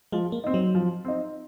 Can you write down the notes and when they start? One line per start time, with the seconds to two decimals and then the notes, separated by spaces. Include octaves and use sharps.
0.12 F3 G#3
0.32 A#3
0.44 C4 D#4
0.54 F#3
0.75 F3
1.05 C4 D#4